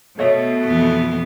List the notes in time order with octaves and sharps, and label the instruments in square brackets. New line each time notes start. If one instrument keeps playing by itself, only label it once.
[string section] B2 [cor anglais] A3 [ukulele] C#5 D#5 E5
[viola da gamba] F2 E3 B3